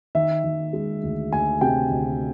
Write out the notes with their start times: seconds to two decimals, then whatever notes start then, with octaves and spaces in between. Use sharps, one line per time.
0.15 D#3 E5
0.44 D#3
0.73 G#3
1.03 D2
1.32 D2 G#5
1.61 C3 G5
1.90 D2